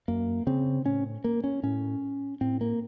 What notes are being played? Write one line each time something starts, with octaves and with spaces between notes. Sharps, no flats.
F#2 A#3
C#3 C4
A2 C#4
A#3
C#4
A2 C#4
A2 C4
A#3